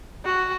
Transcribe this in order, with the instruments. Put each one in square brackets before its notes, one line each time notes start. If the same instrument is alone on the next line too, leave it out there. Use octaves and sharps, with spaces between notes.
[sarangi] F#4